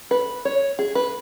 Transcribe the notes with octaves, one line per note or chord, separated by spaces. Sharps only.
B4
C#5
G#4
B4